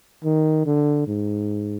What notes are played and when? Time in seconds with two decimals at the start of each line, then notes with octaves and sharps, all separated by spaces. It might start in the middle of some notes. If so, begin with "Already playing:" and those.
0.24 D#3
0.66 D3
1.08 G#2